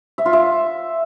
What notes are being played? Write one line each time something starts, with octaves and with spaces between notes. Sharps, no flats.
E5
F4
E5